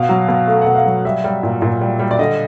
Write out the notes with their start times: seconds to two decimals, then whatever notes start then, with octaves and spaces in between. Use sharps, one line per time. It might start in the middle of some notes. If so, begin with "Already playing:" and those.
Already playing: B2 F5
0.09 F#3
0.29 B2
0.47 A3 F5
0.62 F#5
0.67 B2
0.75 F5
0.86 F#3
1.05 G3 E5
1.24 G3
1.43 A#2
1.62 A#2
1.81 G3
2.00 G3
2.11 D5
2.19 D3 D#5